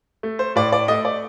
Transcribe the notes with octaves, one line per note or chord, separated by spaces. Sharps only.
A3
C5
A2 D5
D5
A3 D#5
D5